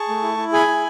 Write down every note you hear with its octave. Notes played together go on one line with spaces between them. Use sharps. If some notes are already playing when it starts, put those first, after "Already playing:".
Already playing: G#4 A5 C#6
A3
E4
E4
G#4 G#5 B5
E4